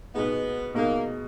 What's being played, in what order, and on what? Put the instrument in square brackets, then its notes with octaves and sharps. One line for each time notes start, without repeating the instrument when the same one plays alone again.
[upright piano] B2 G#3 D#4 [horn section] B3
[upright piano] B2 G#3 D#4 [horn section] A#3